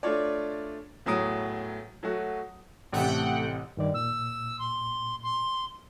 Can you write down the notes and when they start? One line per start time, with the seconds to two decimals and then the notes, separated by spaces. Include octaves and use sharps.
0.03 A3 D4 F4 C#5 D5
1.06 E2 A2 F#3 A#5 D#6 D7
2.03 F#3 A3 F#4
2.92 A1 C3 A3 F#5 G5
3.77 G2 D#3 D5
3.94 A#2 E6
4.59 C6
5.23 C6